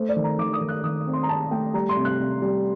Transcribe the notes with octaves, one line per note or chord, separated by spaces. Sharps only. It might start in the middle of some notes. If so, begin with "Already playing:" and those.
Already playing: A3 C5
D5
D#3
A#5
D#3 D6
D#6
D#3
F#6
D#3 D#6
C4
C6
A#5
C4 A5
A3 G5
G3 A#5
C6
C3
F#6
C3
G3